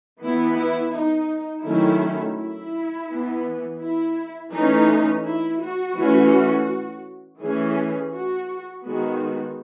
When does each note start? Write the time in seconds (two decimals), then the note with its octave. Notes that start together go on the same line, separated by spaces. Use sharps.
0.20 E3 B3 E4
0.56 E4
0.93 D#4
1.64 D#3 F#3 A3 C#4 E4
2.37 E4
3.09 E3 B3
3.81 E4
4.53 E3 A3 C#4 D#4
5.24 E4
5.61 F#4
5.96 E3 A3 C#4
7.40 E3 A3 C#4 G#4
8.13 F#4
8.84 D#3 G#3 B3 F#4